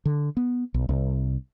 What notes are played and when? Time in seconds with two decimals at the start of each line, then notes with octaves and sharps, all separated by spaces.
0.05 D3
0.37 B3
0.74 B1
0.89 C2